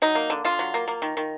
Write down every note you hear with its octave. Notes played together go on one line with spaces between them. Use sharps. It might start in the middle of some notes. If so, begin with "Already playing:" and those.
F#3 D#4
A#3
D3
D3 F4
F#3
A#3
A#3
D#3
D#3